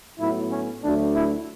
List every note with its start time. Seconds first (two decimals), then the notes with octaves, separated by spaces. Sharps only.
0.18 A2 F#3 B3 E4
0.50 C#4
0.82 D2 D3 F#3 A3 D4
1.14 E4